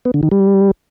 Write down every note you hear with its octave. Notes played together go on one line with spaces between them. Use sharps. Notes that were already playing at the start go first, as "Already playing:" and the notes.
B3
D3
D#3
G3